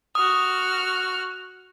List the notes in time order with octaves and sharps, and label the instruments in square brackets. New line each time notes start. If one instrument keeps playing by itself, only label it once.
[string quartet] F#4 F6 [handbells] D#6